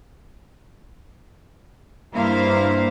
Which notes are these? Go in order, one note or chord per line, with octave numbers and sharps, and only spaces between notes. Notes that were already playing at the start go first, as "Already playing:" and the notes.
G2 A#3 D4 E4 C5 F5